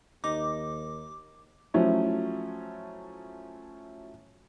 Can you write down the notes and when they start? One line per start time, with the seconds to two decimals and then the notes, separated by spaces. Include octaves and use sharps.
0.24 D#2 D#4 D6
1.74 F3 F#3 A3 C#4 E4